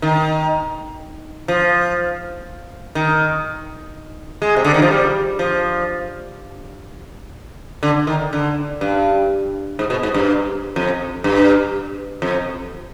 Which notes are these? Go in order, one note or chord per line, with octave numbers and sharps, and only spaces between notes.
D#3
F3
D#3
G#3
C3
D3
D#3
F3
G3
F3
D3
D#3
D3
G2
G#2
B2
G#2
G2
F2
G2
F2